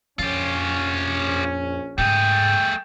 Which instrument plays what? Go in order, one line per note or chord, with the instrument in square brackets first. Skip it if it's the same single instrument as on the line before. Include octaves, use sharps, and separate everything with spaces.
[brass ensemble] A#1 C#4 [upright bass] F2 [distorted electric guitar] F4 G4
[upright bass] G#2 C#3 [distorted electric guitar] A3 G#4 [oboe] G5